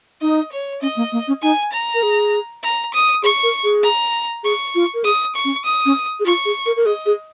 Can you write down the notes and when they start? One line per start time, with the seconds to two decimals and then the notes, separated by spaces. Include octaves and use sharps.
0.21 D#4 D#5
0.52 C#5
0.82 C#4 D#5
0.96 A#3
1.12 A#3
1.28 C#4
1.42 D#4 G#5
1.72 A#5
1.94 A#4
2.03 G#4
2.63 A#5
2.94 D#6
3.23 G#4 C#6
3.43 A#4
3.64 G#4
3.83 A#5
4.44 G#4 C#6
4.75 F4
4.94 A#4
5.04 G#4 D#6
5.35 C#6
5.45 C#4
5.65 D#6
5.86 C#4
6.20 G#4
6.25 F4 C#6
6.45 G#4
6.66 A#4
6.77 A#4
6.86 G#4 D#5
7.06 G#4